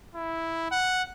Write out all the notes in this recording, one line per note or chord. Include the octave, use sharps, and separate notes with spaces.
E4
F#5